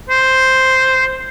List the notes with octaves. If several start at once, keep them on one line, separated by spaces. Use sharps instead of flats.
C5